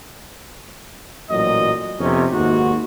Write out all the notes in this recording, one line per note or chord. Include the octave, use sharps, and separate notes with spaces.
A1 A#2 F#3 D#5
F2 C3 B3 C#4 D#4
D#2 G#2 F#4